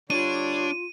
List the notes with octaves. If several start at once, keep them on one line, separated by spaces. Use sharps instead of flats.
D3 G3 D4 F4 C#5 D#7